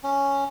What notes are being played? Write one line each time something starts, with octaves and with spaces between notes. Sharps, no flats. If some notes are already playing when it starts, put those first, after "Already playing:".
C#4